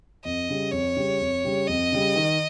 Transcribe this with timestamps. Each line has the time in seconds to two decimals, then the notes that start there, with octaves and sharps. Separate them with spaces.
0.25 F2 D#5
0.49 C#3 G3
0.72 F2 C#5
0.96 C#3 G3
1.21 F2
1.44 C#3 G3
1.68 F2 D#5
1.92 C#3 G3
2.16 D#3